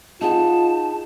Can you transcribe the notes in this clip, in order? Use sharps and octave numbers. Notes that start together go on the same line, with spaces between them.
D#4 F4 G#4 F#5 A5